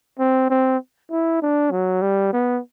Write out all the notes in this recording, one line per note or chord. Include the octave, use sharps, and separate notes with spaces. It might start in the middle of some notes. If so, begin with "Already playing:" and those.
C4
C4
E4
D4
F#3
G3
B3